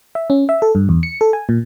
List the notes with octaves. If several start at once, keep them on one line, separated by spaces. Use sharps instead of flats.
E5
C#4
E5
A4
G2
E2
C#7
A4
G#5
A#2